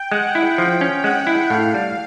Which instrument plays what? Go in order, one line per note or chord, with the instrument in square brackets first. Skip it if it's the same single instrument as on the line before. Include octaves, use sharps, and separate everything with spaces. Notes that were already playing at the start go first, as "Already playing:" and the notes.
Already playing: [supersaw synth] G5
[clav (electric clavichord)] G#3 [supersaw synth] F#5
[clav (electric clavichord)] E4
[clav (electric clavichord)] F3 [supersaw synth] G5
[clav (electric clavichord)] C#4
[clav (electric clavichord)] G#3 [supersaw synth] F#5
[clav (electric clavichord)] E4
[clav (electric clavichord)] A2 [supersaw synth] F5
[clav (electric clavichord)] G3